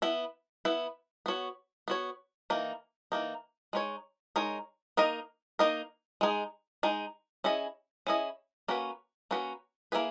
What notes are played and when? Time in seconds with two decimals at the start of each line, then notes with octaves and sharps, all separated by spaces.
0.02 B3 E4 B4
0.65 B3 E4 B4
1.26 B3 F#4 C#5
1.88 B3 F#4 C#5
2.50 E3 A#3 D#4
3.12 E3 A#3 D#4
3.73 G#3 D#4 A#4 C#5
4.36 G#3 D#4 A#4 C#5
4.97 A#3 D#4 A#4 D#5
5.59 A#3 D#4 A#4 D#5
6.21 G#3 D#4 G#4
6.83 G#3 D#4 G#4
7.44 C#4 E4 G#4 D#5
8.07 C#4 E4 G#4 D#5
8.68 A#3 C#4 F#4 B4
9.31 A#3 C#4 F#4 B4
9.92 A#3 C#4 E4 G#4 B4